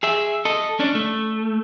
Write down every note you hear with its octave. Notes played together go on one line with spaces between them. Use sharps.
G#4 E5
A4 D#5
C#4 D4
A3